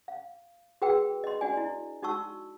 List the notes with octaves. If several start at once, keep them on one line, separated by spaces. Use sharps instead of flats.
F5
F#4 G#4 B4 G5 E6
D#5 C6
D4 F#4 D5 G#5
E4
D#4 F#4 A5 C#6 E6